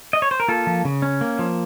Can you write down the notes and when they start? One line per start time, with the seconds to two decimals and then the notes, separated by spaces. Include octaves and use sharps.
0.13 D#5
0.22 C#5
0.31 C5
0.40 A#4
0.48 A#3 F4 A4
0.67 F3
0.85 C#3
1.02 C#4
1.21 A#3
1.39 F3